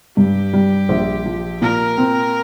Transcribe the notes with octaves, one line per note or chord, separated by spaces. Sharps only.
G2 G4
G3
A#1
F3
A#2 A#4
C4